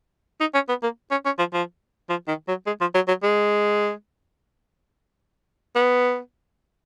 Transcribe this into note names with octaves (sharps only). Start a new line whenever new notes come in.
D#4
C#4
B3
A#3
C#4
C#4
F3
F3
F3
D#3
F#3
G#3
F3
F#3
F#3
G#3
B3